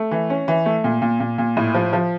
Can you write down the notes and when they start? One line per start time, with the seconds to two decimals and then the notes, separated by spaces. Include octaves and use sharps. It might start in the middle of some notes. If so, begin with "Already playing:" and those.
Already playing: A3
0.11 E3
0.30 C#4
0.48 E3
0.66 A3
0.84 A#2
1.02 A#2
1.20 A#2
1.38 A#2
1.57 A2
1.75 F3
1.93 F3